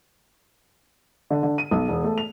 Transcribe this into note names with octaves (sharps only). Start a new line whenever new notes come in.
D3
D3
D#7
B1
E1
A3
F7